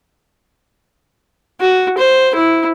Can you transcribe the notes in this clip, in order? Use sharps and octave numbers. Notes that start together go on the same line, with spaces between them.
F#4
C5
E4